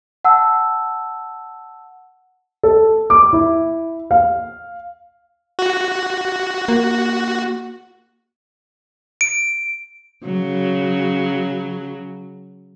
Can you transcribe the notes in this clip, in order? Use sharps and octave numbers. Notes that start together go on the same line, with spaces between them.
F#5 A5 E6
A4
D6
E4
F5
F#4
A#3
D7
C#3 F#3